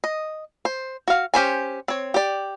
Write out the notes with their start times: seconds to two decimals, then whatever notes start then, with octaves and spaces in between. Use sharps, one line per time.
0.04 D#5
0.65 C5
1.08 F#4 F5
1.34 C#4 G4 C5 G#5
1.88 C4 C#5
2.14 G4 D5